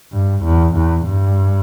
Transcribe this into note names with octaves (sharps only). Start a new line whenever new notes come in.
G2
E2
E2
G2